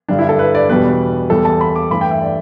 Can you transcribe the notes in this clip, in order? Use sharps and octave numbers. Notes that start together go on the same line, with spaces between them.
G2 D3 G3 D4
E4
A4
B4
D5
E2 B2 G3 B4
E2 E3 G3 A4
A5
B5
D6
G2 E3 A3 B5
G5
E5
D5